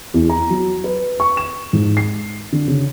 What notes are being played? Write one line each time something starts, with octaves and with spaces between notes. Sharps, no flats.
E2
A#5
F#3
B4
C#6
E7
G#2
C7
D3
C#3